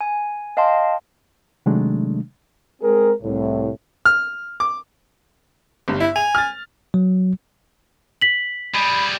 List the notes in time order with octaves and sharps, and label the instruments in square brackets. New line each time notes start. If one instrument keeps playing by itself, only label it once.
[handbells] G#5
D#5 F5 G5 A5 C6
[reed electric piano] C3 D#3 F#3 G#3 A3 D4
[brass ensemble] G#3 C4 G#4 A#4
C2 A2
[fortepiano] F6
D6
[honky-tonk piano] G1 G2
[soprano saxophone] E4 [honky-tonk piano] E5
[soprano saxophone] G#5 [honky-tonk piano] F7
[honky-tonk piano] F6 A6
[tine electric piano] F#3
[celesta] B6 F#7
[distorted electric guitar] G3 G#4 [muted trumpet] B5